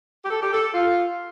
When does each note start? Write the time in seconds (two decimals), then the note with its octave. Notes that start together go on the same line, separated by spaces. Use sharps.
0.23 G4
0.29 A4
0.40 G4
0.51 A4
0.73 F4